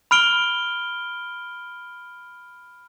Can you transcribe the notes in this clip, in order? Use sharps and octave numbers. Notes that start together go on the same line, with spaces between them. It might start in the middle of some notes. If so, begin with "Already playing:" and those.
B5 F6 D7 G7